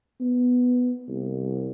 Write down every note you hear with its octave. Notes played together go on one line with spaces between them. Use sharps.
B3
C2